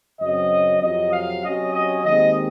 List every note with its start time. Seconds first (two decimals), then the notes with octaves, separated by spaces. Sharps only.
0.21 F#2 C#3 F#3 C4 D#5
0.82 F2 C3 F#3 D#5
1.12 F5
1.43 C3 F#3 C#4 D#5
1.74 D#5
2.04 D#2 D#3 G#3 C4 D#5